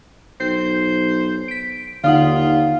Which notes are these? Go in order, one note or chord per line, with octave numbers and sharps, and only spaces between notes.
B1 C5
B6 D7
D#2 D3 D#4 F4 F#5